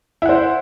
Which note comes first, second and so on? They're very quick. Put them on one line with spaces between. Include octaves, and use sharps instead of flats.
E4 F#5 C5